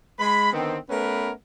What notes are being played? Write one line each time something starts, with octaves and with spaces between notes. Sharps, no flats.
G#3 B5
D3 D#3 B3 C4
A3 B3 C#4 A#4 B4